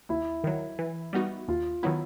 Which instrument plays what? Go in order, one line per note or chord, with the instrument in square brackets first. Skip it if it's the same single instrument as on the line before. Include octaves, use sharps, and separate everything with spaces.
[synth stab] D#2 [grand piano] E4
[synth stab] D#3 F#3
E3
G3 B3 D#4 F#4
[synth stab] D#2 [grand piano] F4
[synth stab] D#3 F#3 B3 E4